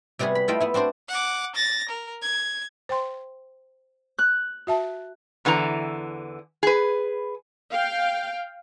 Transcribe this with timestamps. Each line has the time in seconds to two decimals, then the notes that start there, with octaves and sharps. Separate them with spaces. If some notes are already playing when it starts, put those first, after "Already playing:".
0.19 C3 G3 B3 F#4 G#4
0.35 B5
0.48 A3 E4 F4 D#5 F5 G5
0.60 B3 E4
0.74 C4 D4 F#4 C5 D5
1.09 F#5 D6
1.55 A6 A#6
1.89 A#4
2.22 G#6
2.89 C5 G5 C6
4.19 F#6
4.67 F#4 E5 A5
5.45 E2 D3 E3 E4 A#5
6.63 G#4 B4
7.70 F5 G5